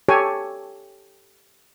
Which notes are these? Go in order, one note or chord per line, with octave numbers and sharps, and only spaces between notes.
G4 A4 C#5 G#5